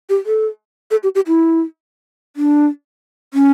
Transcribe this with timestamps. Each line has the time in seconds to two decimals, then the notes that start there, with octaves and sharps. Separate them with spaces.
0.10 G4
0.26 A4
0.91 A4
1.03 G4
1.15 G4
1.27 E4
2.36 D4
3.34 C#4